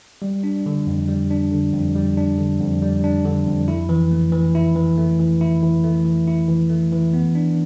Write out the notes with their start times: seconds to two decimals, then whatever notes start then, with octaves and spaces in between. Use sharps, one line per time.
0.22 G3
0.44 D4
0.66 D3
0.87 F2
1.08 G3
1.31 D4
1.51 D3
1.73 F2
1.95 G3
2.17 D4
2.38 D3
2.60 F2
2.82 G3
3.04 D4
3.25 D3
3.47 F2
3.68 E4
3.89 E3
4.11 A3
4.32 E3
4.55 E4
4.75 E3
4.98 A3
5.19 E3
5.41 E4
5.63 E3
5.84 A3
6.05 E3
6.28 E4
6.48 E3
6.70 A3
6.92 E3
7.14 B3
7.35 D4